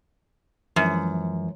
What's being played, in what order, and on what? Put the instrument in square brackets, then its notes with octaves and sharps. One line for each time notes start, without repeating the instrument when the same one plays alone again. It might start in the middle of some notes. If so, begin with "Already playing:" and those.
[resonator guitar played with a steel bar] F#2 [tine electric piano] E3 F3 G#3